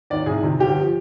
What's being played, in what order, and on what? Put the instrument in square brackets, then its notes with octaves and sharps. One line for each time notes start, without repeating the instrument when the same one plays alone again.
[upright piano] D#2 D#3 D5
C2 G#4
C3 D#3
G1 G4
F3